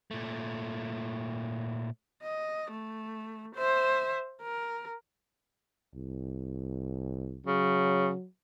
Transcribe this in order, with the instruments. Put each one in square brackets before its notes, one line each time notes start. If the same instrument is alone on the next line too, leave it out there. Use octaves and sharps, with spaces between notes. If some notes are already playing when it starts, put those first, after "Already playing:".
[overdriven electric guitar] A#2 A3
[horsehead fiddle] D#5
A3
C5 E5
A#4
[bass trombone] C2
[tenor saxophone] C#3 [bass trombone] F#3